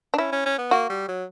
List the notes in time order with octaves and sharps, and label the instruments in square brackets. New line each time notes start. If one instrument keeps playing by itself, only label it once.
[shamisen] D4
[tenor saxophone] C#4 [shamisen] E4
[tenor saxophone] C#4
C#4
B3
[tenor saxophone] A#3 [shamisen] F#4
[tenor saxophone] G3
F#3